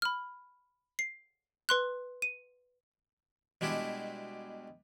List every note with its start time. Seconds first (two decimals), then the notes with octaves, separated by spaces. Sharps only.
0.02 B5 F6
0.99 C7
1.69 B4 C6 F#6
2.22 D#7
3.61 B2 G3 G#3 D4 E4